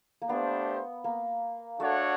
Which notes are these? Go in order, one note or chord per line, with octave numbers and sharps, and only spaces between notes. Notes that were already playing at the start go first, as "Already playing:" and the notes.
A#3
A3 B3 D4 G4 C5
A#3
A3 D4 F#4 A4 C#5 F#5